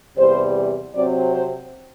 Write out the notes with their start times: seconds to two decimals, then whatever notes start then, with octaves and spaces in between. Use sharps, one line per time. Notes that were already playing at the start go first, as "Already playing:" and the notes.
0.17 E2 C3 G3 C5
0.93 C3 F#3 C4 D5
1.32 C5